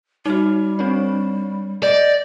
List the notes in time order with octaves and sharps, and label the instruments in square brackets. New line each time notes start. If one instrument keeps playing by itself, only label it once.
[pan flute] G3 [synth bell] D#4 F#4
[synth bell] C4 D4 C#5
[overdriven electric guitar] D5 [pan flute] D#5 [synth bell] G6